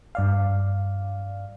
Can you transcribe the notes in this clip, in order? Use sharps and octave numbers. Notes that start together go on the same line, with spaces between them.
G2 D5 F5